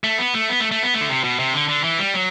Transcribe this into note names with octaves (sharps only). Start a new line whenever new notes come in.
A3
B3
A3
B3
A3
A3
B3
A3
D3
C3
B2
C3
D3
D3
E3
G3
F#3